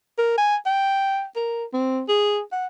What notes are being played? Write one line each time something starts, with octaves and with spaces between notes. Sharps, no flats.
A#4
G#5
G5
A#4
C4
G#4
F#5